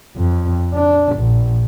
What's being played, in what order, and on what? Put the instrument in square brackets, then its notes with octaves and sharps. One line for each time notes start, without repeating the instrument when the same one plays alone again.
[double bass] F2
D4
A#1